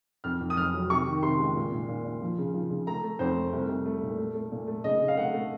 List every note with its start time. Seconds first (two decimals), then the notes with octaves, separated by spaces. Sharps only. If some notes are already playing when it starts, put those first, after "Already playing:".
0.24 F2 F6
0.41 F2
0.50 D#6
0.57 F2 F6
0.74 F#3
0.90 C3 C#6
1.07 D#3
1.23 C3 C6
1.39 C#2
1.56 A#2
1.72 A#2
1.88 A#2
2.05 A#2
2.22 F3
2.38 C#3
2.54 F3
2.70 C#3
2.87 A3 A#5
3.03 A3
3.19 F2 C5
3.36 A3
3.53 C2
3.69 C2
3.86 A3
4.02 A#2
4.18 A3
4.35 A3
4.52 A#2
4.67 A3
4.84 C#3 D#5
5.01 C#3
5.08 F5
5.17 A3 F#5
5.34 A3